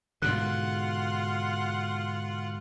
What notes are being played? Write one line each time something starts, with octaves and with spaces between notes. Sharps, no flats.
G#2 B2 D3 F4 F#5 F#6